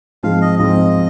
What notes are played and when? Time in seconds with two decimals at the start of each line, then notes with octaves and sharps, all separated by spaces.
0.23 G#2 F3 G#3 C4 F5
0.42 D#5
0.59 G#2 F3 G#3 C4 D#5